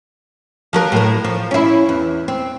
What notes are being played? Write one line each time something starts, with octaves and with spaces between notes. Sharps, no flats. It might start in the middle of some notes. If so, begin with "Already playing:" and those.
F3 F#3 A#4
A2 A#4
F3
C#4 E4
E2
C4